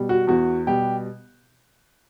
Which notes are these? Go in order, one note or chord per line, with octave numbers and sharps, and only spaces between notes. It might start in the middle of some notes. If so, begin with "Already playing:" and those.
Already playing: B2 G3
F#4
E2 F#4
B2 G3 G4